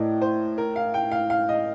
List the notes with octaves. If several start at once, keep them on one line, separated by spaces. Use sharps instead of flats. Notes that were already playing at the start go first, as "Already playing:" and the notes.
Already playing: A2 A#4 D5 D#5
C5
A#4
F5
G5
F5
F5
D#5